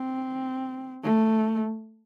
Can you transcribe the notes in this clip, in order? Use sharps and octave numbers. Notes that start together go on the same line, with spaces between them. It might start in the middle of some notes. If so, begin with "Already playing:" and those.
Already playing: C4
A3